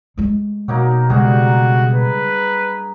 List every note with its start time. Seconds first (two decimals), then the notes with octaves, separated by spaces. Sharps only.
0.17 G#3 A3
0.68 B2 F#3 A#3 D#4
1.10 G2 C#3 G#3 F#4 G#4 A#5
1.94 B4